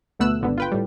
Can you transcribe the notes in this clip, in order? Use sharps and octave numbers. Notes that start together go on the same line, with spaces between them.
D2 B2 A3 B3 E6 F#6
G#1 D3 B3
F4 B4 G5
A2 G3